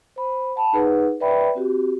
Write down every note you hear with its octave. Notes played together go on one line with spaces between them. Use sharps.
C5 B5
F#5 A5 B5
D#4 G#4 B4 F#5
B4 D5 E5 G5 B5
C4 F#4 G4